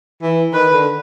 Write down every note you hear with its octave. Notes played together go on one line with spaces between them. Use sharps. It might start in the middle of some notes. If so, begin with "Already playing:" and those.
E3
D#3 B4
D3